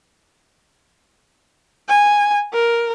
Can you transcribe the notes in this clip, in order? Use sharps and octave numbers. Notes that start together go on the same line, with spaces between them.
G#5
A#4